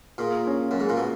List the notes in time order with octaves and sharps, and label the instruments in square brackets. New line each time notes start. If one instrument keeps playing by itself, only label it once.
[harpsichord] A#2 [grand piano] G#4
[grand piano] C#4
[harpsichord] F#2
[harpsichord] G#2 [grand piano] A#3
[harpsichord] A#2
B2